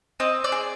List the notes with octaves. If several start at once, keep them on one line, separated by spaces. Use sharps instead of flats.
C4 D#5
D5
G#4